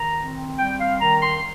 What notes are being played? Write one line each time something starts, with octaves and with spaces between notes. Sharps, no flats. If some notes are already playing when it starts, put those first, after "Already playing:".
Already playing: D#3 A#5
C4
G3 G5
F5
D#3 A#5
C6